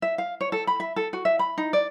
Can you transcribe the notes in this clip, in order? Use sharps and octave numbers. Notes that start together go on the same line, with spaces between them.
E5
F5
C#5
A4
B5
E5
A4
F#4
E5
B5
D#4
D5